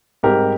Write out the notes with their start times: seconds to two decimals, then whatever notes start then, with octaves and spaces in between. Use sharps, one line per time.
0.23 G#2 G3 C4 G4 A#4